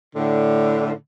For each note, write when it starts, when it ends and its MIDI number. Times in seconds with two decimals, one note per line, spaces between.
0.16 0.94 45
0.16 0.94 50